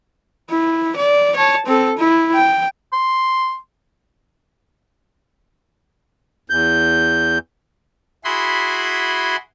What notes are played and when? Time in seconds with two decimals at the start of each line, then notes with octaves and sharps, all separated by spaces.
0.50 E4
0.96 D5
1.36 C#5 A5
1.66 C4 A4
1.98 E4
2.35 G5
2.93 C6
6.50 E2 G6
8.24 E4 F#4 G#4 B5 C6